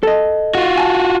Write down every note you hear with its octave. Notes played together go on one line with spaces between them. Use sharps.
A4 D#5
F4 F#4
G#5 A5